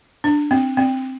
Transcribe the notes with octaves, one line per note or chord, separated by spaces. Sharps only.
D4
C4
C4